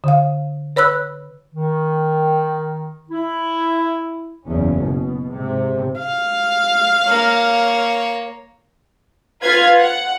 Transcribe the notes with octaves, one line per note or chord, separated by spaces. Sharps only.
D3 F5
B4 C#5 B5 E6 F#6
D#3
E4
F#1 E2 C#4
B2
G#2 C3
F5
A#3 C#5
F4 B4 F5 F6 G#6
F#5